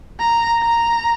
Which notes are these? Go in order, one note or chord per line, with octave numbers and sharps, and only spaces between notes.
A#5
A#5